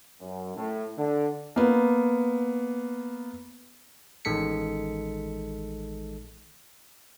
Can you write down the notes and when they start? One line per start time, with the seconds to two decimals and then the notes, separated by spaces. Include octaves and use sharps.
0.21 F#2
0.55 A2
0.98 D3
1.56 A#3 B3
4.25 A1 D#3 G#3 A4 B6 C#7